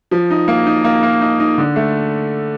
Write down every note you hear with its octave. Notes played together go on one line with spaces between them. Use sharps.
F3
D#4
A#3
D#4
A#3
A#3
D#4
D#4
D3
A3